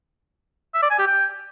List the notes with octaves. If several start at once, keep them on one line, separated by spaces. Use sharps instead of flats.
E5
D5
G#5
G4
G5